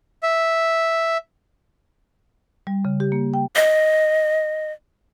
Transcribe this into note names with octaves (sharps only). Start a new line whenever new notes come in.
E5
G3
C#3
G4
A#3
G5
D#5